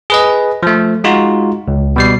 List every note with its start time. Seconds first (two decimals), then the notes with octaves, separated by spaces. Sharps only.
0.10 G#4 B4 D#5
0.63 F3 A3
1.04 G#3 D#4 F4 F#4
1.68 C#2
1.96 B2 G3 C7